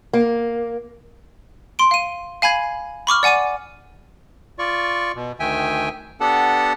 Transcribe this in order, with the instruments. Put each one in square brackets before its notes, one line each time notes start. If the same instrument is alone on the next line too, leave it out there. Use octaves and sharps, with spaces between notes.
[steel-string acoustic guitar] A#3
[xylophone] C6 D7
F5 D#7
F5 G#5 B5 G#6
B5 C#6 D6 F6
D5 F#5 G#5 D6 D#7
[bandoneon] F4 D5 C#6
B2
D2 D#3 E5 G5 G#5
B3 D4 G4 A4 F#5 A5